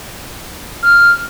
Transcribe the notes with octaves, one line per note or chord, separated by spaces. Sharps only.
F6